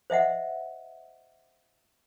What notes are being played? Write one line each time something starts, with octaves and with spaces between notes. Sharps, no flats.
C5 D#5 E5 F#5